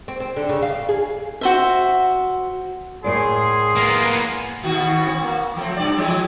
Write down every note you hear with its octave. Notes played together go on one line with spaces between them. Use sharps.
C4
C4
D3
C#3
F5
G#4
F#4 C5 E5
A2 G#4 A#4 D5 C6
A#3 B3
D#2 B2 F#4
C4
A#3
F3 A3 C4
G2 C3 D5
E3 F3 G#3